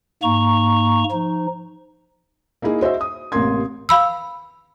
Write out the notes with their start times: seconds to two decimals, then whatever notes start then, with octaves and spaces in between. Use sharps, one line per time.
0.23 G#2 A#3 A#5 C#6
1.11 F3 D#4
2.62 A#3 D#4 E4 G#4 F5
2.81 F#4 C5 D#5 E5
3.01 D#6
3.32 A1 C3 A#3 A#4 C6 G#6
3.89 F5 B5 E6